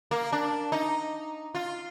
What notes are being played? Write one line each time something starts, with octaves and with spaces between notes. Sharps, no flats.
A#3
D4
D#4
F4